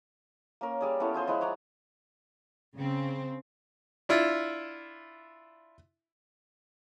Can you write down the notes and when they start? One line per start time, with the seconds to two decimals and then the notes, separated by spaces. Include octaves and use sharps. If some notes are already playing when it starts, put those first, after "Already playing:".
0.61 A#3 C#4 A#4
0.81 G3 G#4 D5
1.00 B3 C#4 E4 A4
1.14 F4 G#4 C5 C6
1.27 F3 G#3 E4 B4
1.41 C#5 D5 F#5 A#5
2.77 C#3 C4
4.09 D4 E4 F4